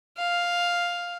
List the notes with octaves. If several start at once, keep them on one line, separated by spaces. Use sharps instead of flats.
F5